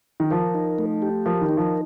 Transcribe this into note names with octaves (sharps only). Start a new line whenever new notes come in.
D#3
F3 A#4
D#4
A3
G4
F3 A#4
D#3
D#4
F3